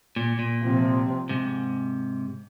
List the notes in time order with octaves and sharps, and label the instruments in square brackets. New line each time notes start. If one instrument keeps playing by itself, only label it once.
[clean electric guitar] A#2
A#2
[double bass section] C3 F3 C4
[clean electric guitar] G#2 C3